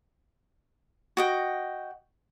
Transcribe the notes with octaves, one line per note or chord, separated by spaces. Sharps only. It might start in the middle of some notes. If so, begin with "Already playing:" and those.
F#4 D#5 G5